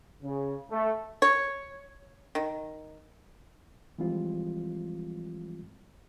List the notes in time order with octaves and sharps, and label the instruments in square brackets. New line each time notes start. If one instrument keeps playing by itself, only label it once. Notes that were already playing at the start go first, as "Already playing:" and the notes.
[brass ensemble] C#3
A3
[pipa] C#5
D#3
[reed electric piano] E3 F3 G3 G#3 C4 F4